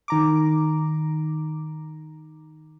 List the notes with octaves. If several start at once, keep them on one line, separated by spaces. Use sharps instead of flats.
D#3 A#5 D6